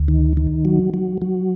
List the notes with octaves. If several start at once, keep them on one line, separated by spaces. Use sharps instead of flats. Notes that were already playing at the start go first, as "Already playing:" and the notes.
Already playing: D2
D#3
D#3
F#3
F#3
F#3